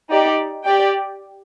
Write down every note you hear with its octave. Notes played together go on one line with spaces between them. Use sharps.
D#4 G4 D5
G4 D5 G5